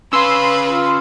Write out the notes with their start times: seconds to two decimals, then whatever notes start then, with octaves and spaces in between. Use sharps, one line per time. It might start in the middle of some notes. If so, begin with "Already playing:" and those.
0.13 C#4 B4 F5 C6 E6
0.67 F4